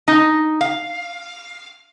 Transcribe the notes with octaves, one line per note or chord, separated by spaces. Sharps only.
D#4
F5